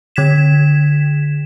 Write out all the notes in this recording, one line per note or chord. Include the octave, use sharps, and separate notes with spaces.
D3 G#6 B6 E7